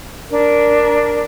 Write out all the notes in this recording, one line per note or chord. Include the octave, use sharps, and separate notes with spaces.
D4 A#4